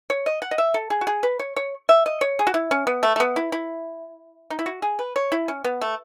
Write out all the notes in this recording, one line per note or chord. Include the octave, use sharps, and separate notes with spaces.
C#5
D#5
F#5
D#5
E5
A4
G#4
F#4
G#4
B4
C#5
C#5
E5
D#5
C#5
G#4
F#4
E4
C#4
B3
A3
A3
B3
E4
E4
D#4
E4
F#4
G#4
B4
C#5
E4
C#4
B3
A3